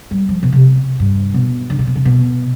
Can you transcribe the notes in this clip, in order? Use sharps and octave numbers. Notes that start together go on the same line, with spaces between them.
G3
F3
B2
C3
G2
B2
D3
C3
B2
C3
B2